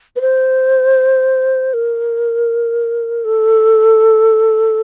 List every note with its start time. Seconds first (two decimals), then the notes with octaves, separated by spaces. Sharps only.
0.16 B4
0.21 C5
1.74 A#4
3.25 A4